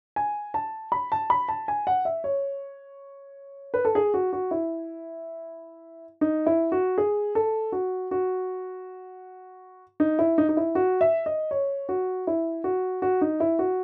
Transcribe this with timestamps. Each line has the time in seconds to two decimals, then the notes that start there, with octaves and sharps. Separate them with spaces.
0.16 G#5
0.54 A5
0.92 B5
1.12 A5
1.30 B5
1.48 A5
1.68 G#5
1.87 F#5
2.05 E5
2.24 C#5
3.74 B4
3.85 A4
3.95 G#4
4.14 F#4
4.33 F#4
4.51 E4
6.21 D#4
6.46 E4
6.72 F#4
6.98 G#4
7.35 A4
7.72 F#4
8.11 F#4
10.00 D#4
10.19 E4
10.38 D#4
10.49 D#4
10.57 E4
10.75 F#4
11.01 E5
11.26 D#5
11.51 C#5
11.89 F#4
12.27 E4
12.64 F#4
13.02 F#4
13.21 D#4
13.40 E4
13.59 F#4